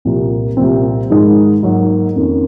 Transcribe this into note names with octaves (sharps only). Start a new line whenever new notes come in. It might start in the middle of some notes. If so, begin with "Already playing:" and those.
C2 A#2 F3 A#3
C2 A#2 F3 C4
G#2 D#3 G#3 D#4 A#4
G#2 F#3 A#3
F2 D#3 A#3 C#4